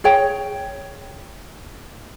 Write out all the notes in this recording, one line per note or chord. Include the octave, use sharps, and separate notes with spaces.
G#4 C#5 G5